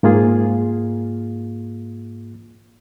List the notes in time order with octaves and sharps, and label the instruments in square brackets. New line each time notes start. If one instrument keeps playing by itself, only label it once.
[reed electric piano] G#2 A#3 F4 G#4